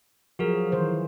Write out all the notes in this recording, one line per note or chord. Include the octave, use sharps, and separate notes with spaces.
F3 F#3 F#4 G#4 A#4
D#3 E3 C5